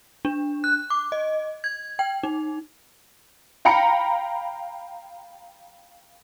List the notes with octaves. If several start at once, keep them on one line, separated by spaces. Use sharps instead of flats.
D4
F#6
D6
D#5
G#6
G5
D#4
F5 G5 A#5 B5 C#7